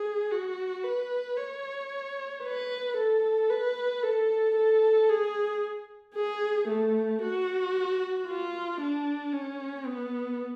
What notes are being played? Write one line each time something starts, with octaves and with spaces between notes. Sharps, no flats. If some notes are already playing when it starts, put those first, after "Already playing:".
Already playing: G#4
F#4
B4
C#5
B4
A4
B4
A4
A4
G#4
G#4
A3
F#4
F4
D4
C#4
B3